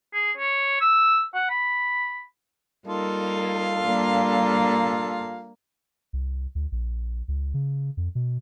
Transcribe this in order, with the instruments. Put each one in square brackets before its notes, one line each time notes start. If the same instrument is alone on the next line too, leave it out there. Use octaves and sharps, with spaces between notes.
[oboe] G#4
C#5
E6
F#5
B5
[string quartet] G3 A#3 D#4 [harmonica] F4 A4 F5
[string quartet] G3 D4 [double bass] A#3
[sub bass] C2
D2
A#1
C#2
C#3
F2
B2